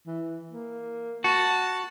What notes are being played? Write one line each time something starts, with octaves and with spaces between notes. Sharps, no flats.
E3
A#3
F#4 A5